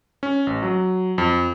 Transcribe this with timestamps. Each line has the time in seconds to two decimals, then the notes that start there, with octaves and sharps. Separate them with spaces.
0.23 C#4
0.47 A1
0.62 F#3
1.18 F2